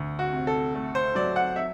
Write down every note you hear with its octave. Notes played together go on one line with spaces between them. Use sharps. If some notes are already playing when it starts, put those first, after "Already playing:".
Already playing: D2
F#4
C3
A4
A3
C5
F#3 D5
F#5
E5